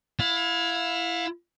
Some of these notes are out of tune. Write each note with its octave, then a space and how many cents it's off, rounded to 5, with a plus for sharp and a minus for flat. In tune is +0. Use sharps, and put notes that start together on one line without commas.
E4 +15 F5 +35